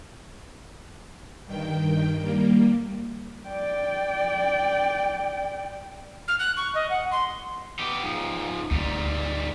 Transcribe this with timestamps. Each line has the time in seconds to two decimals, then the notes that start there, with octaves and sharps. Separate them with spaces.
1.46 G2 D#3 G5
2.20 G3 A#3
3.47 D5 G5
6.28 F6
6.39 F#6
6.57 C#6
6.75 D#5
6.90 F#5
7.11 C6
7.79 B3 G4
8.03 G#2 F3
8.71 D2 G#2 G3 C4